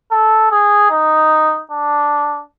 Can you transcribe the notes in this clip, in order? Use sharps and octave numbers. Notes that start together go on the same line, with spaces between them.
A4
G#4
D#4
D4